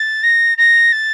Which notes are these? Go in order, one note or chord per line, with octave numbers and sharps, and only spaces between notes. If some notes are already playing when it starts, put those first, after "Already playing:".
Already playing: A6
A#6
A#6
A6